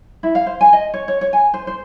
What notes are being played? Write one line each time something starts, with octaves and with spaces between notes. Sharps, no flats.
E4
F5
C5
G#5
D#5
C#5
C#5
C#5
G#5
C5
C5